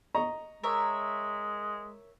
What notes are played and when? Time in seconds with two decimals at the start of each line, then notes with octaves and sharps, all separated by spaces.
0.15 D#5 A#5 C#6
0.64 G#3 A#4 C#5 E5